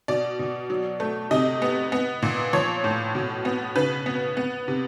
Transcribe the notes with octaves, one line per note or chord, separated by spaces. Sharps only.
B2 D5
B2
F#3
A3
C3 D#5
B3
B3
A#2
F3 C#5
A2
B2
B3
C#3 B4
B3
B3
C3